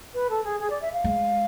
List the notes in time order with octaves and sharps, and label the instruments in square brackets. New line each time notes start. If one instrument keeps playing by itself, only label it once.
[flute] B4
A4
G#4
G#4
D5
E5
F5
[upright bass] G#3